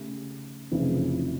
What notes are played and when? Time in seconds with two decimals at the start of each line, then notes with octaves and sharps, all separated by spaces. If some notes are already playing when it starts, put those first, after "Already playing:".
Already playing: C#3 A3 G4
0.72 F1 F2 C#3 E3